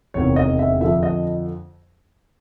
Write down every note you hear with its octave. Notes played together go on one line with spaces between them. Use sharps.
E1 E2 C3 D#3 C#5
D#5
E5
F2 D3 F3 E5
D#5